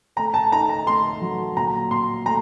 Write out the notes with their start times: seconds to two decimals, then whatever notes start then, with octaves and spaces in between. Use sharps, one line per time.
0.16 A3 A#5
0.34 A5
0.52 D#4 A#5
0.69 A#5
0.87 A3 C6
1.21 F#3
1.57 A#2 A#5
1.91 A#2 C6
2.26 A3 A#5